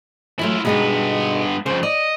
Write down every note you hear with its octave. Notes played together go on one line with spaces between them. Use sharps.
E3 F#3 A3 E4 F4
G2 B2 G#3 B3 D#4
F2 C#3 C5
D5 D#5